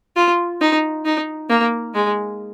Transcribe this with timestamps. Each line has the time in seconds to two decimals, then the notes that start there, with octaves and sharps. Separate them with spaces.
0.16 F4
0.61 D#4
1.05 D#4
1.49 A#3
1.94 G#3